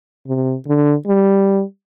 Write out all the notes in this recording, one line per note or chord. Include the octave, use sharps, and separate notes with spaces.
C3
D3
G3